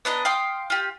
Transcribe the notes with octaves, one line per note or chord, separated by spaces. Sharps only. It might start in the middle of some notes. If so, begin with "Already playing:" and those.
B3 D4 D#5 A#5
F5 G5 C6 D#6
F4 G4